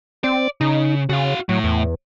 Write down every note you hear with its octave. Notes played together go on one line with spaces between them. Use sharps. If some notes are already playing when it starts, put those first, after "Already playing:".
C4 D5
C#3 D#4
C#3 F#4 F5
A2 F#3
E2